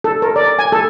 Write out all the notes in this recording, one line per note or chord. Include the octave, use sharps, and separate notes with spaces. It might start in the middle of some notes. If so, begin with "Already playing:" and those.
A4
A#4
D5
G#5
A4